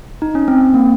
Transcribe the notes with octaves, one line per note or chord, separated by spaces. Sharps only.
D#4
C#4
C4
C4
A#3